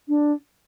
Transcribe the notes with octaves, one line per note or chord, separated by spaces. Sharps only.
D4